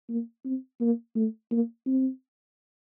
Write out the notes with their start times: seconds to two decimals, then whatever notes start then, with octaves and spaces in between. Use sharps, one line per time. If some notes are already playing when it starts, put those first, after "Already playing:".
0.09 A#3
0.45 C4
0.81 A#3
1.16 A3
1.51 A#3
1.86 C4